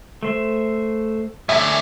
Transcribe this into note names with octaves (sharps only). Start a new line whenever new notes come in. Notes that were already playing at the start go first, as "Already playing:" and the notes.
A3 C5 E5
A2 D3 E5 G#5